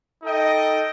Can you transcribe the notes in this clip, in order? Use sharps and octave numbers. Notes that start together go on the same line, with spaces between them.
D#4 A4 D#5 G5